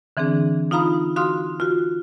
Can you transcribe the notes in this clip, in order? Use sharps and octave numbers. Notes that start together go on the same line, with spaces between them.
D3 E3 C4 D4 G#4
D#4 F4 F5 A#5 B5 D#6
F#4 F5 C6 D#6 F6
F4 F#4